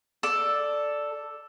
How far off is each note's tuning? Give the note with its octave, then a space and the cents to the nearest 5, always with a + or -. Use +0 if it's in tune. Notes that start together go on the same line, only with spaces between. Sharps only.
A4 +0 D5 +0